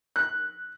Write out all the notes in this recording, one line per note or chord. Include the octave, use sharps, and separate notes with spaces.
F#6